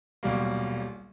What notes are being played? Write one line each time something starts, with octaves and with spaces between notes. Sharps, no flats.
D#1 B1 G3 A#3